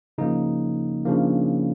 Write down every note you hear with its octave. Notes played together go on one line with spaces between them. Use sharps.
C#3 F3 A#3 D#4
C#3 F3 A#3 D4